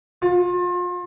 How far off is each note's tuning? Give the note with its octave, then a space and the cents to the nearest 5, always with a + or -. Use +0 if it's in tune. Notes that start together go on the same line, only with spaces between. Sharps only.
F4 +35